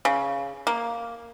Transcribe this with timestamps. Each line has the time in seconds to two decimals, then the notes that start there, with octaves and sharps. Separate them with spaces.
0.05 C#3
0.67 A#3